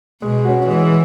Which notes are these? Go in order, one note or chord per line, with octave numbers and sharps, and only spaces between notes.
B2 G#3
C#4 F#4
E3 G#3